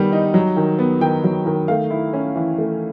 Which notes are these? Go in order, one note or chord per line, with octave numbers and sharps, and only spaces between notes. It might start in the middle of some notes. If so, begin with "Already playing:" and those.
Already playing: D#3 G3 B3
D#4
F#3
D#3
B3
D#3 G5
F#3
D#3
A3 F5
E4
C#4
E3
A3